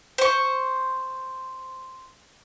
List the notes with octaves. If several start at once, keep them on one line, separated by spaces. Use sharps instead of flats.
C5 C#6